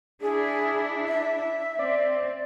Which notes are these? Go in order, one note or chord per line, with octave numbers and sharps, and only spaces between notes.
D4 E4 G#4
E5
C4 D5